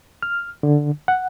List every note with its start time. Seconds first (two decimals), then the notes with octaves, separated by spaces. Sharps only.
0.23 F6
0.63 D3
1.08 F#5